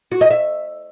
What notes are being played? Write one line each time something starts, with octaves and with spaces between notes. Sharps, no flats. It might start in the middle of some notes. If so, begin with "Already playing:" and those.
F#4
D#5
E5